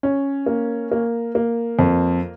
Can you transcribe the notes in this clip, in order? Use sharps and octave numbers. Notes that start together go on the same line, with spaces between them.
C#4
A#3
A#3
A#3
F2